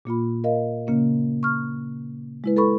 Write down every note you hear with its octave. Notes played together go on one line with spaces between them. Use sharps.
A#2 A#3 F4 B5
A#4 D#5 F5
C#3 A#3 C#4
C#6 F6
G#3 E4 B4
A4 B4 B5 C#6